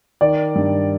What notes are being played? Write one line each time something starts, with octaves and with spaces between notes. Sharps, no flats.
D#3 D5
G2